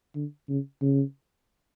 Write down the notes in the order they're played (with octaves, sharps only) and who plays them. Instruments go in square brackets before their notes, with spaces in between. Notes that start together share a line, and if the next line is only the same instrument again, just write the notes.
[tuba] D3
C#3
C#3